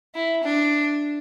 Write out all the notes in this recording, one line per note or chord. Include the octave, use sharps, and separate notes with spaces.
E4
D4